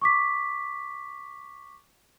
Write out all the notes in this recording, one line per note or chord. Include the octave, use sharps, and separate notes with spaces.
C#6 D6 B6